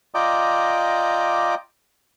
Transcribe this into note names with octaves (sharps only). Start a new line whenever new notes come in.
F4 D5 D#5 G5 A#5 D6